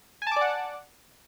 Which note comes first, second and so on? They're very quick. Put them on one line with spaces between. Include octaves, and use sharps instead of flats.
G#5 A5 D6 D5 F#5